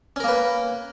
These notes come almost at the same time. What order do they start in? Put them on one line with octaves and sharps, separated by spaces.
C#4 A#4 A#3 B4